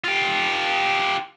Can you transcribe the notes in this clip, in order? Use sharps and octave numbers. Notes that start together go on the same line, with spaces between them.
F4 G4